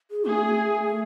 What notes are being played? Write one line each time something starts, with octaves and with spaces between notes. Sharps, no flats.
G#4
A3 G#4